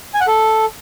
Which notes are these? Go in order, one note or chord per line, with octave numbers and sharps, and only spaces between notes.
G#5
F#5
A4